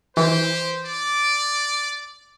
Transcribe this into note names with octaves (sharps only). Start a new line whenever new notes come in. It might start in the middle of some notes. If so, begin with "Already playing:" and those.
E3 G4 C5
D5 D6